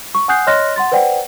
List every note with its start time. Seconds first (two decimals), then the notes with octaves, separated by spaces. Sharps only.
0.15 C#6
0.28 F#5 G#5 D#6 F#6 G6 C7
0.47 C#5 D#5 C6 F6 F#6 A#6
0.76 F#5 C6 A6
0.92 B4 C5 D5 F#5 G5